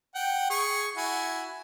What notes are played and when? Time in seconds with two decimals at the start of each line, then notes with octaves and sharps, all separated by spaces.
0.15 F#5 G5
0.50 G#4 C#6
0.96 E4 F#4 G#5